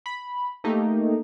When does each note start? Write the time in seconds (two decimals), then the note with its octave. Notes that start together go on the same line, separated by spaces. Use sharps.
0.06 B5
0.64 A3 A#3 D#4 G4